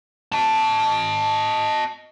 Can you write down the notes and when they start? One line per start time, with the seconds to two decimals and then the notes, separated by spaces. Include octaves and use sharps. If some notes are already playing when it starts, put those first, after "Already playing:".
0.32 D#5 A5